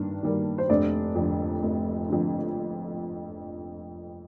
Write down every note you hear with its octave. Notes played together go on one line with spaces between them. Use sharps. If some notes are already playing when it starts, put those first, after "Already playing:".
Already playing: G2 D#3 D4
D#3 G3 A#3
C5
F1 D4 D5
F2 D3
F1
F2 D3